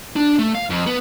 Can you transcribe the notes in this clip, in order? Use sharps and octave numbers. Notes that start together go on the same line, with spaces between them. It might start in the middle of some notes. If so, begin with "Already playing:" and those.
D4
A3
F5
F2
B3